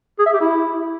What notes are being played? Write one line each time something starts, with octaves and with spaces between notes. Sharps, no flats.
G#4
E5
G4
E4